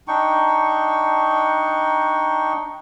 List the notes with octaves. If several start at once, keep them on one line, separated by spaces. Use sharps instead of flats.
D4 D#4 G5 C#6